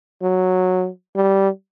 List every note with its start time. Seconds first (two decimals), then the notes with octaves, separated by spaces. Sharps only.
0.22 F#3
1.16 G3